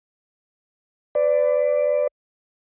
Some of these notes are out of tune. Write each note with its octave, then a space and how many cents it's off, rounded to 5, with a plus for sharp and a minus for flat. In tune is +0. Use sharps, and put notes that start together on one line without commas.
B4 +35 D5 +0